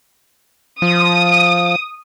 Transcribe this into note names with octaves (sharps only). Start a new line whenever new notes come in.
F3 D#6